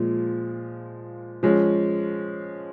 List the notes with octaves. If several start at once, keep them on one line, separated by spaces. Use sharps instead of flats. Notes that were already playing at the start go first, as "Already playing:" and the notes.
Already playing: A#2 F3 G#3
F3 G#3 C#4